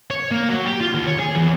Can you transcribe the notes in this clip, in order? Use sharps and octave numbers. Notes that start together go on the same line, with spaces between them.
C#5
A#3
F#3
G4
F4
D#2
C#5
G#4
E2